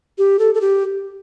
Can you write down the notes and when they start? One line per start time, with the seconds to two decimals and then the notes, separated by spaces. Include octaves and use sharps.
0.18 G4
0.39 A4
0.55 A4
0.61 G4